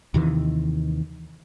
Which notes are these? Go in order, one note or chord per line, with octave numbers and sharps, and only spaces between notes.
D#2 C3 D#3 E3